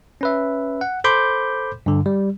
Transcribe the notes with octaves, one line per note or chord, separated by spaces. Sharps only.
C#4 B4 E5
F#5
A4 C5 B5 C6 D6 G6
G2 D3
G3